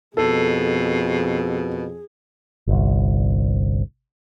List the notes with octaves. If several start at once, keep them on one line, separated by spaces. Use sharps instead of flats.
F2 B2 G#4 A4
G1 C2